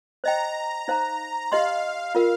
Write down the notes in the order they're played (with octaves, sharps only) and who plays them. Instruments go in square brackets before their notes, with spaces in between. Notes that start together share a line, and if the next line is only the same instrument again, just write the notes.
[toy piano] C5 D#5 G5 [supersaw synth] A#5
[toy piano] D#4 C5 F5 A#5
[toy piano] G4 D#5 C6 [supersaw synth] F5
[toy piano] F4 A#4 F5